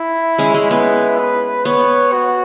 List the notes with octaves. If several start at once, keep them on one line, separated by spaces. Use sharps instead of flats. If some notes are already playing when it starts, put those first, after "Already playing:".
Already playing: E4
G#3 C#4
G#3
B3 E4
B4
B3 C#5
F#4